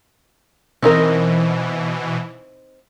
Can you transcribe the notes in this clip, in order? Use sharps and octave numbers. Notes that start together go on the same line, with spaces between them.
B2 E3 C4 D#4 A#4